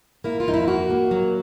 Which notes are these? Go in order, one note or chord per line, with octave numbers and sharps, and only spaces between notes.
A#3 E4
F4
F2 D#4
E4
A#3 F#4
A#3
F#3